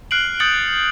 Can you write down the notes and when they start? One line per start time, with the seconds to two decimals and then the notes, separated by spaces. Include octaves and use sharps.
0.11 F6 F#6 C7 D7 F#7
0.40 D#6 G6 A6 C#7 F#7